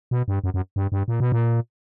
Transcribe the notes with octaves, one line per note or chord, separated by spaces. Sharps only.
B2
G2
F#2
F#2
G2
G2
A#2
B2
A#2